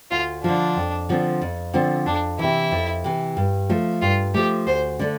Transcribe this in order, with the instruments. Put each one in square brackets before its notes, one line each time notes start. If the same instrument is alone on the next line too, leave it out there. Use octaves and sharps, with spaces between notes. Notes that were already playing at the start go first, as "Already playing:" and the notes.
[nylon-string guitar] D2 [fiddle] F4
[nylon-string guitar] D3 F3 [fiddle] D4
[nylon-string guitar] F2
D3 F3 C4
F2
D3 F3 C4
[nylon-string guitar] F2 [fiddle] D4
[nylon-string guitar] C3 E3 [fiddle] E4
[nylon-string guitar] F2
C3 E3
G2
F3 A3
[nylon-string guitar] G2 [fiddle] F4
[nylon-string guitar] F3 A3 [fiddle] G4
[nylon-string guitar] D2 [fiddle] C5
[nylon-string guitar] D3 A3 D4